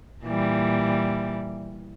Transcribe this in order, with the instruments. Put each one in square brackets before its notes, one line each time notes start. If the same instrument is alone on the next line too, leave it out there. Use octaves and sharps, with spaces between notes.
[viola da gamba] A#2 E3 G3